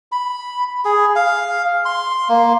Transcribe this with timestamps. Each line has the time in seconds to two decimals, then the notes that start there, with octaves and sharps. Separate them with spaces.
0.12 B5
0.85 G#4
1.16 F5
1.85 C6
2.29 A#3